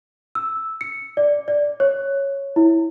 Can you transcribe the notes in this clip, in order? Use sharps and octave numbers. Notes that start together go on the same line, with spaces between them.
E6
C#7
D5
D5
C#5
E4